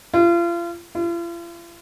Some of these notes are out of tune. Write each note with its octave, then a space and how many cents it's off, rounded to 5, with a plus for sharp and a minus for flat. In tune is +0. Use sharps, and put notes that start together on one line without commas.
F4 -35
F4 -45